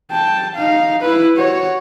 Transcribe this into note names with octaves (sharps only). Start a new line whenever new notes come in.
G5 A5
D#4 F5
E4 B4
F#4 C#5